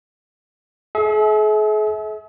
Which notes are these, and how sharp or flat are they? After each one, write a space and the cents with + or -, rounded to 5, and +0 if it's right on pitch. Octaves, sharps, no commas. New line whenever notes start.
G#4 +45 E5 -30